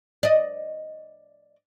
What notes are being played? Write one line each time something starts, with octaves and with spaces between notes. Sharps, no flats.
D5 D#5